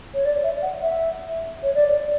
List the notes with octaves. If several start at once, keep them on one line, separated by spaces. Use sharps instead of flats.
C#5
D5
E5
F#5
E5
C#5
D5